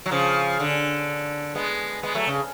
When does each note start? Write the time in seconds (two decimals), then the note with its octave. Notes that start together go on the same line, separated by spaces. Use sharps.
0.06 F#3
0.11 C#3 F3
0.60 D3
1.55 G#3 B3
2.03 G#3 B3
2.15 F#3 A3
2.27 C#3